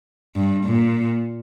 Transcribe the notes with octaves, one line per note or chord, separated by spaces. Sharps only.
G2
A#2